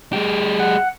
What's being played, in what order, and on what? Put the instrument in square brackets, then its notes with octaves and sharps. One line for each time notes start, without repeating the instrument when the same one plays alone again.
[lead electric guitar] G#3 G4
[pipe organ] F#5